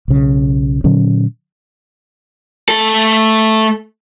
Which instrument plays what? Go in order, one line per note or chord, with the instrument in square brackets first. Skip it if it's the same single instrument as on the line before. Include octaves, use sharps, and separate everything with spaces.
[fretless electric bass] B1 C#3
A#2 D3 F#3 C#4
[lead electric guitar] A3 A4